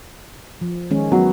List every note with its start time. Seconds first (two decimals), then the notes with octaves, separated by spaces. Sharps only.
0.61 F3
0.90 D#3 G#3 C#4
1.12 F#3 B3